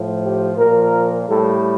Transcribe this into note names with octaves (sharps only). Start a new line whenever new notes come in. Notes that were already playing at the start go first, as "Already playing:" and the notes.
Already playing: A2 F3
G4
A#2 F3 A#4
A2 G3 A4